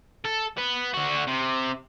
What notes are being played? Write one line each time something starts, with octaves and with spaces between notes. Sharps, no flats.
A4
B3
D3 F#4
C3